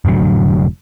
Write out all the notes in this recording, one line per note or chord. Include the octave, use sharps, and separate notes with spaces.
F1 A2 D3 F#3